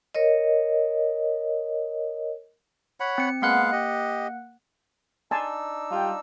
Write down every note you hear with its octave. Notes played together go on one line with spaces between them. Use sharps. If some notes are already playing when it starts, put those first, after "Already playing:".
A#4 C#5 D#5
C#5 F#5 B5
C4 C#7
G#3 A#3 B3 F5 F#5 F#6
G4 D#5
D4 D#4 G#5 A5 C6 E6
G3 F4 G5